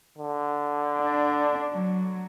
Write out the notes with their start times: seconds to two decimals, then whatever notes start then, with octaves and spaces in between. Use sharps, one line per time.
0.18 D3
0.99 D4
1.74 F#3